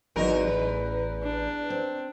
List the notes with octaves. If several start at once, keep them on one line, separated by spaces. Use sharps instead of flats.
G#1 E2 F#3 D#4 F#4 A#4
A1 B4
D4
C4